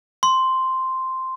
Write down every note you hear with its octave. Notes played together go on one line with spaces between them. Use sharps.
C6